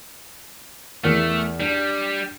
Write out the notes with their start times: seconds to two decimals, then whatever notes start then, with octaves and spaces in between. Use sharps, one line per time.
1.04 E2 A3 A#4 F6
1.60 G3 D4